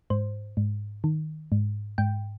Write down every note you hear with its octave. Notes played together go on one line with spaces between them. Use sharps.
G#2 C5
G#2
D#3
G#2
G#2 G5